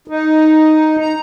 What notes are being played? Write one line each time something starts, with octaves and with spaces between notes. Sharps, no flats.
D#4
A#5